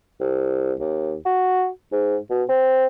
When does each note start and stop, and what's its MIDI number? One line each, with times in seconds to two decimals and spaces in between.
0.21 0.73 36
0.80 1.14 39
1.25 1.68 66
1.92 2.17 44
2.30 2.43 47
2.49 2.86 60